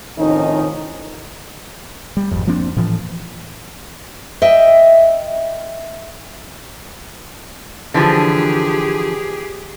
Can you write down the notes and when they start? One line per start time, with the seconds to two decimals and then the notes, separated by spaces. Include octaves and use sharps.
0.18 A2 C3 D#3 F3 C#4 D#4
2.17 G3
2.31 G#1 F2
2.47 F3 A#3 C4 D4
2.76 A2 E3 F3
4.42 D#5 E5 G5
7.94 D3 E3 F3 G4 G#4